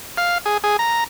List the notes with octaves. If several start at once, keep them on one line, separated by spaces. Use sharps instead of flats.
F5
G#4
G#4
A#5